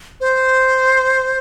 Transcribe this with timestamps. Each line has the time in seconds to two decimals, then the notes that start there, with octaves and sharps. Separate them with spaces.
0.21 C5